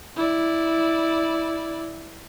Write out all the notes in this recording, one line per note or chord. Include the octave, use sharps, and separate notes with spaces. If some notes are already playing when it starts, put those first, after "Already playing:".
E4 D5